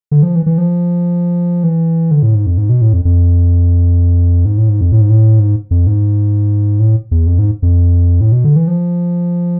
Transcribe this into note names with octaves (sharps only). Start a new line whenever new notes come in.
D3
F3
E3
E3
F3
E3
D3
A2
G#2
F2
G#2
B2
A2
F2
F2
G#2
A2
G#2
F2
A2
G#2
A2
G#2
F2
G#2
A2
E2
F2
G#2
F2
A2
B2
D3
E3
F3